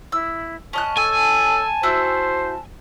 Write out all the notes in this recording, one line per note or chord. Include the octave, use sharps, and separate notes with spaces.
E4 E6
C#4 D#5 A5 F#6
A4 G#5
E4 F#4 C5 E6